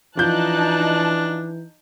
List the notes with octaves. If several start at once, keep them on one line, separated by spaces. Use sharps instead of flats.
E3 F3 D4 D#4 A5 F#6 G6